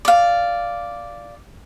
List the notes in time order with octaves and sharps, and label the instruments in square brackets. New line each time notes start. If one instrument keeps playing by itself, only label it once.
[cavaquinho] D5 F5